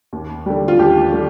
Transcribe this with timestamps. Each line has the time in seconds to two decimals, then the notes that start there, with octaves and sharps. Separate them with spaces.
0.13 D#2
0.46 D3 G3
0.68 F4
0.79 D#2 G4
1.12 D3 G3